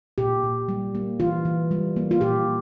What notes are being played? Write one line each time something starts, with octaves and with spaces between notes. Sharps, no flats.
A#2 G4
A#2
G3
A#3
E3 F4
E3
G3
A#3
F4
A#2 G4